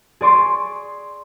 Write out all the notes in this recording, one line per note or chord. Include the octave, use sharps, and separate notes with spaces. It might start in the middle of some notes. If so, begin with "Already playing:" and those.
G#4 D5 C6 C#6